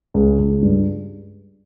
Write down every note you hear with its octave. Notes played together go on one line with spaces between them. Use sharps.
C#2
C#2
G2